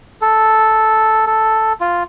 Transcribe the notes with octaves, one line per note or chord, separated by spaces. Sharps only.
A4
A4
F4